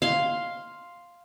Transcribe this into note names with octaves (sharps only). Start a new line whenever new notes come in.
F5 C6